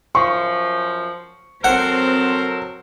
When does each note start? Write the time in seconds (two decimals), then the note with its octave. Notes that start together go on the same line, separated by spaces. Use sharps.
0.15 F#2 F3 C#6
1.64 F#3 C4 A4 A#4 C5 F#5